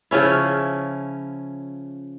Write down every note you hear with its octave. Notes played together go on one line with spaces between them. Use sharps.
C#3 F3 C#4 E4